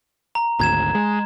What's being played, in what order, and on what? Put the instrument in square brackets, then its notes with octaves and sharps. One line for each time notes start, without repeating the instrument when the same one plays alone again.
[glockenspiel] A#5
[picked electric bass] G#1 D2 [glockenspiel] A#5 G#6 E7
[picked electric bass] G#3